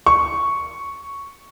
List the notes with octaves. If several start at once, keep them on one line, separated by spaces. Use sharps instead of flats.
C#6